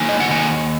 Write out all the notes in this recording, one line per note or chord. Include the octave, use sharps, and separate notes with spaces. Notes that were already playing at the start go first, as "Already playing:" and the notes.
Already playing: D#3 F#3 A#3 D#4 G#5
D#5
F#5
D#3 A#3 G#5